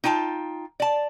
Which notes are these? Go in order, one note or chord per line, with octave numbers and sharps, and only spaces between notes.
D#4 F4 G5 A5
D5 A5